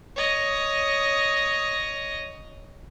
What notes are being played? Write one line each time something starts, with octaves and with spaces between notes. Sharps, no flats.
C#5 D#5